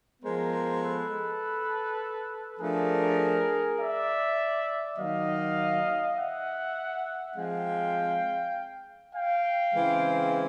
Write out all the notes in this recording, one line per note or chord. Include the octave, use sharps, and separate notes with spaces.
F3 G#3 B3 A#4 C5
A4 B4
F3 A3 D4 G#4 A#4
D5 E5
D#3 F#3 A#3 D#5 F5
E5 F#5
F3 G#3 C4 F5 G5
F5 G5
C#3 E3 G#3 C4